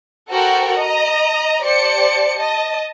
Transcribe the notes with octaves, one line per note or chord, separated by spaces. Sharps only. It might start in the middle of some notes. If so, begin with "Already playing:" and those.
F#4 A4 A#4 C5 F#5 G5
D#5 A#5
G4 C5 D5 A5 C#7
D#5 A5